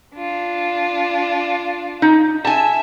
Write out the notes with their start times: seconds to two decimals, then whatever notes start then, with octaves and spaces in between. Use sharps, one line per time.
0.15 D4 F4
2.02 D#4
2.45 E5 G#5 A5